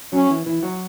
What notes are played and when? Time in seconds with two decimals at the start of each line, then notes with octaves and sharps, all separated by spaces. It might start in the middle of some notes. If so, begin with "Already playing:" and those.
0.13 F#3 C#4 F#4
0.30 E3 E4
0.46 E3 E4
0.63 F#3 F#4